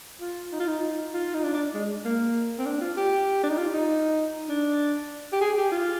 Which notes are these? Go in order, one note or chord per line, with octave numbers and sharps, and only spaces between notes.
F4
D#4
F4
D#4
F4
D#4
D4
D4
G#3
A#3
C4
D4
F4
G4
D4
D#4
F4
D#4
D4
G4
G#4
G4
F4